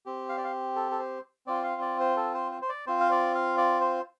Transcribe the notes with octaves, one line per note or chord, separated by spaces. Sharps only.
C4 G4
F5
D5
F5
A4
A4
C5
C4 F4 D5
F5
D5
C5
A4
C5
C5
C5
D5
C4 F4 C5
F5
D5
F5
D5
C5